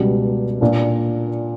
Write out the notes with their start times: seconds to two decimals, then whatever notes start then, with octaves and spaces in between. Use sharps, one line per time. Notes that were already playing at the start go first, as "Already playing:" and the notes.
Already playing: C#2 B2 G3 B3
0.61 A#2 A#3 D4